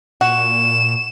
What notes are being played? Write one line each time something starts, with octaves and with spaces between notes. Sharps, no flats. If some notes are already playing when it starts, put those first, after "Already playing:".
A#2 F#4 E7